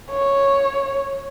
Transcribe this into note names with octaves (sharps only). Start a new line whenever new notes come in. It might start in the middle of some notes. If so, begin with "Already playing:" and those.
C#5